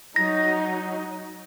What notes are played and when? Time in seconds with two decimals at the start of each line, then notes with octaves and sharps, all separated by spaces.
0.16 F#3 D#4 A#6